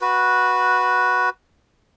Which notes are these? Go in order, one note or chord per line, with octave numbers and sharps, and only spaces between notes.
F#4 B4